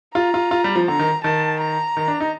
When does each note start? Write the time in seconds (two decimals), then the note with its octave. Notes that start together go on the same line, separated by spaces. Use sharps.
0.15 F4 A#5
0.34 F4
0.51 F4
0.64 G3
0.76 F3
0.87 D3 A#5
0.99 D#3
1.24 D#3 A5
1.60 A#5
1.97 D#3
2.08 D4
2.20 D#4